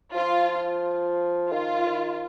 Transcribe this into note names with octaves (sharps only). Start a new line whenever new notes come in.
F3 F4
D#3 F4
D#3